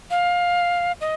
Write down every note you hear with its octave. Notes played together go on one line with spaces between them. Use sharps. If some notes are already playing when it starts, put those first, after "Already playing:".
F5
D#5